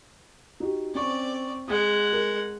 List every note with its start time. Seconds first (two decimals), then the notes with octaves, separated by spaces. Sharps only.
0.60 D#4 F#4 G4
0.95 C4 C#4 D5 C#6
1.68 G#3 F#5 D#6
2.12 A#4